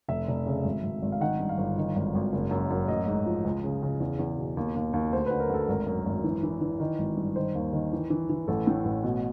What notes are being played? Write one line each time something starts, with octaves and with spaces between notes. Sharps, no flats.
F1 E5
F1
C#3
G#1
G#1
G#1
F5
D#3 F#5
G2
F5
G1
D#3
G#1
G#1
F#1
F#2
F#2
A1 D#5
G#2
F3
C#2
C#3
C#3
E2
E2
B2
D#2
D#2
D#2
D2 C5
D3 B4
A#4
D2 A4
G#1 A#4
F#2
G#1
E3
E3
E3
D#3
G#1
G2
D#3 C5
D#2
D#3
E3
E3
E3
A1 A4
A2
A1
B2